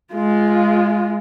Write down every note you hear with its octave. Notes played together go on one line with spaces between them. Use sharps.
G#3 F4